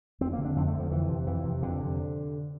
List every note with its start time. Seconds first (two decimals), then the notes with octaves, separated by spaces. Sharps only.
0.21 F2 C4
0.33 A#3
0.38 D3
0.45 D4
0.56 F2 C4
0.68 A3
0.73 D3
0.80 F3
0.91 F2 E3
1.09 C3
1.27 F2 E3
1.44 C3
1.62 F2 D3
1.80 C3